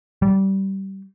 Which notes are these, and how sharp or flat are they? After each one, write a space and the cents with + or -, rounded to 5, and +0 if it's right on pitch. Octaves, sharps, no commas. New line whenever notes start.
G3 -20